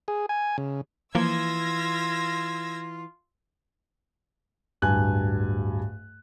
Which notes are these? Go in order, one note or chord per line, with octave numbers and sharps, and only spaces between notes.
G#4
G#5
C#3
E3 F3 A#3 F4 E6 G#6 A#6
D1 G2 G#5 F#6